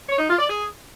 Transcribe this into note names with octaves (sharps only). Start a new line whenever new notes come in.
C#5
D#4
F4
D5
G#4